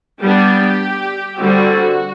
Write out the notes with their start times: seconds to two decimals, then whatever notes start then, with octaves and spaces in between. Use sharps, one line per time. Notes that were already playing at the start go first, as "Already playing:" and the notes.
0.21 G3 B3 D4 G4
1.38 D3 G3 C4 F#4